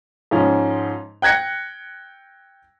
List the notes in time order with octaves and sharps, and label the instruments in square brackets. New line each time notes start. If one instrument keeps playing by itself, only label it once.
[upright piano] G#2 F3 C#4
G5 F#6 G#6 A#6 C#7